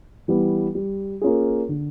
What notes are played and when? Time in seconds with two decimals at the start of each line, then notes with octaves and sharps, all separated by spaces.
0.28 E3 G3 B3
0.75 G3
1.22 A#3 C#4 F4 G#4
1.69 D3